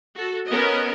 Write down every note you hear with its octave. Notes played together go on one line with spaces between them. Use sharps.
F#4 A4
B3 C#4 A#4 B4 D#5